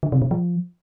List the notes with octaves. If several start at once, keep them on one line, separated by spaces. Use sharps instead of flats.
D3
C3
B2
F3